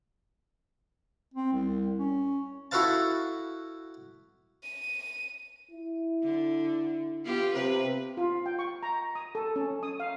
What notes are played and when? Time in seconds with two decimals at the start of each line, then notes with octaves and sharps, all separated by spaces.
1.34 C4
1.53 C2
1.98 C#4
2.71 E4 F#4 A4 B4 F5 A5
4.63 D#7
5.71 E4
6.23 D3
7.24 B3 F4 G4
7.54 C3 B4
8.17 F4
8.46 G5
8.59 C#6
8.83 A#5
9.15 D#6
9.35 A4
9.56 C#4
9.83 D#6
10.00 F5